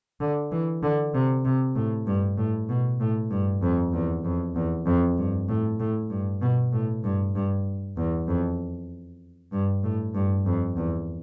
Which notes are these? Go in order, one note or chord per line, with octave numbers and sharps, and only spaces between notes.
D3
E3
D3
C3
C3
A2
G2
A2
B2
A2
G2
F2
E2
F2
E2
F2
G2
A2
A2
G2
B2
A2
G2
G2
E2
F2
G2
A2
G2
F2
E2